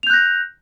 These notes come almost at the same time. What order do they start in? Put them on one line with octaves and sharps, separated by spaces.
F7 G6 F#6 A#6